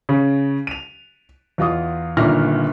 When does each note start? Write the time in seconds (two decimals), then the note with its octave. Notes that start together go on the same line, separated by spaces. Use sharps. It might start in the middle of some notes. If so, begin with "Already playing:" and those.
0.09 C#3
0.67 D#7 F7
1.58 E2 F4 D#5 D#6
2.17 G1 A#2 D#3 E5 F6 A#6